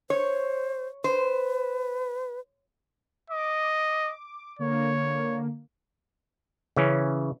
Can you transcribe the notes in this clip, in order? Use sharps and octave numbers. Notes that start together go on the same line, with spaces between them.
C5 C#5
B4 C5
D#5 D6
D3 A#3 C#5
C#3 E3 C#4